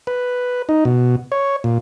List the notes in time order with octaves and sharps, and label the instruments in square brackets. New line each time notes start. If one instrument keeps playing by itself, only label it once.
[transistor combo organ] B4
D#4
B2
C#5
A#2